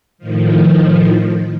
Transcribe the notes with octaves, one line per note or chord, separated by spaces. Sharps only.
A2 D#3 F3